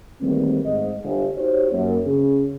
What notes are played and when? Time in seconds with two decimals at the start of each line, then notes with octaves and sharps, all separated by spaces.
0.21 E2 D#3 G3 A3 A#3 C4
0.66 G#2 A3 D#5
1.04 G1
1.37 D#4 F#4 G4 C5 C#5
1.73 F#2 A#3
2.05 C#3 C#4 G#4